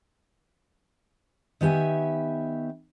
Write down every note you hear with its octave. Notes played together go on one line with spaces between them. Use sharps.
D#3 B3 G4 E5 G#5